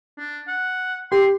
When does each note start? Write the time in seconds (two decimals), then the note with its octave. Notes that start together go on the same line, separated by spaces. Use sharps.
0.18 D4
0.48 F#5
1.12 G4 C6